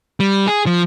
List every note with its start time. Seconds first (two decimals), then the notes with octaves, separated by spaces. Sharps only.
0.20 G3
0.48 G#4
0.66 F3